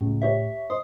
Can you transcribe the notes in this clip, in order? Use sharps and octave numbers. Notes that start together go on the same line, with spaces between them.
C#2 A2
G4 C#5 E5
C5 D#5 D#6